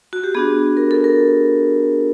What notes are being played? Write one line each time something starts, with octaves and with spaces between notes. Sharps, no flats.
F#4
G4
B3 D4 F#4 G#4
A#4
A4
A#4